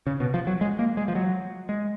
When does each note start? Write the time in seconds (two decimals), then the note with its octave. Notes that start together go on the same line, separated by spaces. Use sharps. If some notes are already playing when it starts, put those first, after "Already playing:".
0.07 C#3
0.20 B2
0.34 F3
0.47 F#3
0.61 G#3
0.79 A#3
0.97 G#3
1.08 F3
1.15 F#3
1.69 G#3